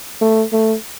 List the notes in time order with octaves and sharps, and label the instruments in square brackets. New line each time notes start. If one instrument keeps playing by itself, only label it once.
[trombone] A3
A3